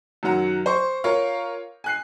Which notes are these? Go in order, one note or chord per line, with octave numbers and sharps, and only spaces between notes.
F#2 D#3 F#3 F#5 A#5
C5 C#6
F4 A#4 C#5 F5
G#5 F#6 C7